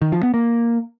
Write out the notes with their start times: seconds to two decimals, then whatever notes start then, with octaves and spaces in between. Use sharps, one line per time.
0.02 D#3
0.12 F3
0.23 B3
0.34 A#3